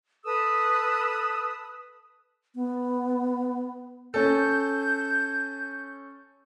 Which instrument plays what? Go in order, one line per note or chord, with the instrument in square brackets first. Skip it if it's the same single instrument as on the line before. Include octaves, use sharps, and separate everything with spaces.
[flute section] A4 B4 D#6 E6
[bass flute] B3
[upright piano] C#4 A4 [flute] G6